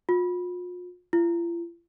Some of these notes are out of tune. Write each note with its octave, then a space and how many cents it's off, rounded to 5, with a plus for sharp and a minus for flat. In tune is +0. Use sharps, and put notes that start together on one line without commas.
F4 +40
F4 -45